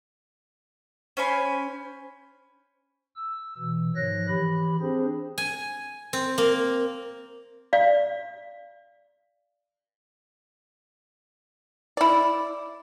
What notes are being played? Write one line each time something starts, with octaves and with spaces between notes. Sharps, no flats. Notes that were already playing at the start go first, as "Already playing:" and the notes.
C#4 C5 G#5 B5
E6
B2 E3
G#2 D#3 F3 C#5 F#6 A#6
E3 G4 B5
C4 D4 G#4 C5
G#5
C4
A#3
D5 F5
E4 D5